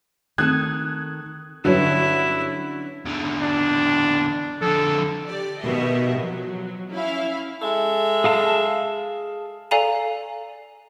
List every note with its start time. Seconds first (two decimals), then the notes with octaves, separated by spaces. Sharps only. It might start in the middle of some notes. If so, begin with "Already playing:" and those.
0.38 D#3 A3 C4 A4 D#6 F#6 G#6
1.65 G2 D3 F#3 G3 C#4 E4 F#4 A4
3.05 E2 D3
3.41 D4
4.62 F2 D3 A4
5.27 G4 D5
5.61 B2 D#3 G4 D#5 E5
6.16 F3 F#3
6.92 C#4 E4 E5 F5
7.62 G#3 A4 E5
8.24 G#4 F5 A5
9.71 A4 D5 F5 G#5 A#5 D#7